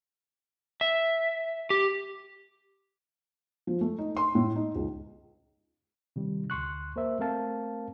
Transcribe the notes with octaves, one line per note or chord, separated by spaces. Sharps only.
E5
G4
F3
A3
D#4
C6
A2
D#4
C#2
C3 D#3 G3
D2 C6 C#6 F#6
A#3 A#4 C5 E5
A3 C4 A#4 F5 A5